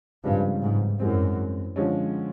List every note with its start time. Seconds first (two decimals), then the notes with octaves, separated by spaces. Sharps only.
0.23 G2 C#3 F3 G#3 C4 F4
0.62 G#2
1.00 F#2 E3 G#3 C4
1.76 D3 F3 G#3 C#4